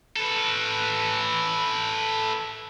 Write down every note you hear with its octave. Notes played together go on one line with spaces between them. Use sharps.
A4 B4